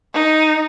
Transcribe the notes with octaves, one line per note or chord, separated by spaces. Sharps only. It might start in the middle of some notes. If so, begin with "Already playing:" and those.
D#4